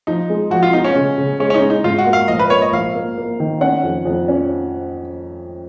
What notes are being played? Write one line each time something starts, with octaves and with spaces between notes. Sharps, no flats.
F3 D#4
G#3
F3 F#4
F4
B3 D#4
C#4
C#3
C#3
G#3 C#4
C#4
D#4
G#3
D#4
G#2 F4
F#4
A#3
F5
A#1 D#5
B4
A#3 C#5
D#5
A#1 F5
A#3
A#3
D#3
C#4 F#5
F2
F2
C#4